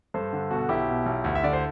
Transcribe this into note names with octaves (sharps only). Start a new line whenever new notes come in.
G2 A4 C5
D3
B2 F#4 A4
B1 E4 G4
B2
B1
D2
E5
D3 D5
C5